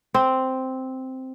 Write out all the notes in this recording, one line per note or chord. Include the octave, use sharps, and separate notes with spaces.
C4